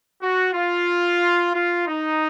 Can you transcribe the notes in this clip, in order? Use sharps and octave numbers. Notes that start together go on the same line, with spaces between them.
F#4
F4
F4
D#4